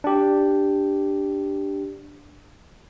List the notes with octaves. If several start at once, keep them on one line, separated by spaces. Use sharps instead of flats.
D4 G4